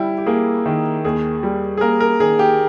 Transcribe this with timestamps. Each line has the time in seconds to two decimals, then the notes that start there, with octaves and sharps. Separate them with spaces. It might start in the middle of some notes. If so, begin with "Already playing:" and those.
Already playing: G3 E4 G4
0.18 G4
0.26 A#3 G#4
0.66 D#3
1.04 D#2 G#4
1.43 G3
1.77 G#4
1.81 A#3 A#4
2.00 A#4
2.20 D#3 G#4
2.39 G4